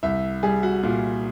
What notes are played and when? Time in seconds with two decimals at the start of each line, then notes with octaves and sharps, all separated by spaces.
0.03 C2 E5
0.43 G3 G#4
0.63 F#4
0.83 A#2 F4